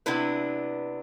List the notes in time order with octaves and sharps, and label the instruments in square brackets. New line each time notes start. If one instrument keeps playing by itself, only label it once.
[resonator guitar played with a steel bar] C3 B3 D4 E4 B4